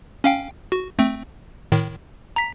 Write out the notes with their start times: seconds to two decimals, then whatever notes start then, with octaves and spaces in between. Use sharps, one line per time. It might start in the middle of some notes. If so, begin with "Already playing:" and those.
0.24 C#4 F5 G5
0.72 F#4
0.99 A3 C4
1.72 A2 D#3
2.36 A#5 B6